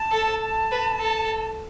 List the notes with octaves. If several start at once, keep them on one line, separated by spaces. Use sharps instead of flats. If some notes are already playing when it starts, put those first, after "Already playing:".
Already playing: A5
A4
A5
B4
A4